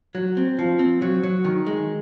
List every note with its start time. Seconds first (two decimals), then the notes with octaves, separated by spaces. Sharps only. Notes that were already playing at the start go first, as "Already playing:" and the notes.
0.15 F#3
0.37 C4
0.59 F3
0.79 C4
1.02 F#3
1.23 F#3
1.44 D#3
1.66 G#3